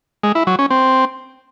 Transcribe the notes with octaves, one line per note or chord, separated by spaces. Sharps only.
G#3
E4
F#3
C#4
C4